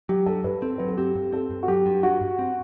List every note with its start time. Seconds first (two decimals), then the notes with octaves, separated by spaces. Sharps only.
0.09 F#3 G4
0.26 G2 A4
0.44 G2 B4
0.62 C4 A4
0.78 F#3 B4
0.88 A4
0.97 C4 G4
1.15 G2
1.32 C4 A4
1.51 G2
1.63 F#4
1.68 F#3 G4
1.86 G2
2.03 G2 F#4
2.21 G2
2.39 C4